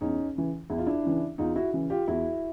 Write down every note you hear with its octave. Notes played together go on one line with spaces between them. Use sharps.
E2 C#4 D#4
C#3 E3
E2 E4
F4
D4 E4
C#3 E3
E2 D#4 F4
E4 F#4
C#3 E3
F4 G4
E2 E4 F#4